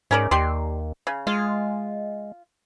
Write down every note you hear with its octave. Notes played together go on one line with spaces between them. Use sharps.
G#2 C#4 A#4 D5
D#2 G4 D5 C6
C#3
G#3 F4